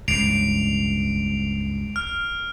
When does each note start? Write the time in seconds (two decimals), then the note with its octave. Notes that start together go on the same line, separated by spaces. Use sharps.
0.08 C#2 G2 C#3 C7 D7 F7
1.96 F6